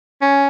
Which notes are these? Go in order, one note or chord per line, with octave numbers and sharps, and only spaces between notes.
C#4